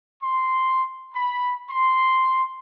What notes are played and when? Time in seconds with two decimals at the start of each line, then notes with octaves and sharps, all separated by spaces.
0.23 C6
1.15 B5
1.70 C6